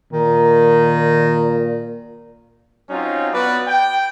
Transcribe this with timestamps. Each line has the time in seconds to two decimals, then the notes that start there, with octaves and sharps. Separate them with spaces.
0.13 A#2 D#3
2.90 F#3 C4 C#4 D#4 F4
3.34 B3 F#4 B4 D5
3.67 G5